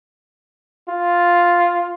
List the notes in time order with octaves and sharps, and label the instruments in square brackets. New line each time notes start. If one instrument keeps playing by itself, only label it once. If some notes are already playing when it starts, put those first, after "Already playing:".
[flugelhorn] F4